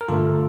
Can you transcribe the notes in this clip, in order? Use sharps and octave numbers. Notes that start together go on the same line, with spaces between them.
A#4
G2 D3 A3 F4 A4